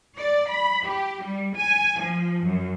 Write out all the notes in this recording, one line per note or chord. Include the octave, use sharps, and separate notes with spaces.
D5
B5
G4
G3
G#5
F3
F#2